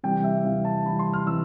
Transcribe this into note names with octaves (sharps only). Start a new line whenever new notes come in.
C3 E3 G3 G5
E5
C3 E3 G3 F5
A5
C3 E3 G3 B5
C6
F6
C3 E3 G3 E6